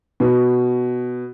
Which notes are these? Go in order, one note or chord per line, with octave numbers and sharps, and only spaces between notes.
B2